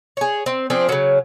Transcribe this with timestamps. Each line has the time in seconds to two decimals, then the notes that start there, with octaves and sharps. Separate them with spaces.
0.17 G#4 C#5
0.46 C4
0.70 F3 C4 D4 G#4
0.89 C#3 F#3